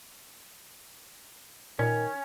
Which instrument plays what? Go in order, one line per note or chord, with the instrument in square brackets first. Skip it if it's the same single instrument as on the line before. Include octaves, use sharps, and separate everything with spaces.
[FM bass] A#2 [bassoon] D#3 [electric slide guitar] C#4